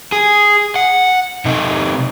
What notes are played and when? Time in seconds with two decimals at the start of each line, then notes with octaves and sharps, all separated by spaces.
0.12 G#4
0.76 F#5
1.45 C3 D#4